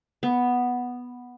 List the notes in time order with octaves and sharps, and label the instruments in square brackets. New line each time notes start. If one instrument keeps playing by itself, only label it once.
[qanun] B3